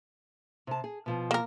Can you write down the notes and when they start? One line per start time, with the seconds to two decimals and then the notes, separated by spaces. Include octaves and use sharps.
0.67 C3 A5
0.84 G#4
1.06 B2 F3 B3
1.31 A#3 A#4